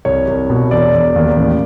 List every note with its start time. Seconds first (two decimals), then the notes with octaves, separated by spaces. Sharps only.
0.05 C2 C#5
0.28 C2
0.50 B2
0.71 E1 D5
0.93 E1
1.16 D#2
1.37 A1